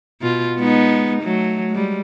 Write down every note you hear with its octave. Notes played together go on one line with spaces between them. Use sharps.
B2 F4
G#3 B3 D#4
F#3 A3
G3 G#3